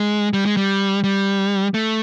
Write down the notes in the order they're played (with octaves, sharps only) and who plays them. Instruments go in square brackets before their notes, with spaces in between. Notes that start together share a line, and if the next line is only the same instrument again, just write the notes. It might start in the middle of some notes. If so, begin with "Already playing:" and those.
Already playing: [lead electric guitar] G#3
G3
G#3
G3
G3
A3